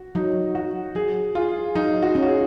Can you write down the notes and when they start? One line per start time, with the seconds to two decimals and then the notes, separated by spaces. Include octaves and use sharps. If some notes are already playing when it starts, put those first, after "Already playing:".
Already playing: F#4
0.15 F#3 D#4
0.55 F#3 F#4
0.95 F#3 G#4
1.35 F4 G#4
1.75 F#3 D#4
2.02 F#4
2.15 C#4
2.23 F#4
2.28 G#4